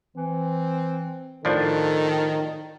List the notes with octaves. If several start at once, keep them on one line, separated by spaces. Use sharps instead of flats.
E3 C4
A2 D#3 F3 D4 A4